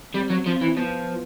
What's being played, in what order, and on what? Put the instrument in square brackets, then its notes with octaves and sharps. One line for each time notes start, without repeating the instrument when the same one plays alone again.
[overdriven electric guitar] G3 [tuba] C4
[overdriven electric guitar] F#3
[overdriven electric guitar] F3 [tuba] C4
[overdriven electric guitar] E3
[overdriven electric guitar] F3 [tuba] B3